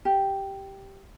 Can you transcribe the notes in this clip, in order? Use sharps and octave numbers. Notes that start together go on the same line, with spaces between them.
G4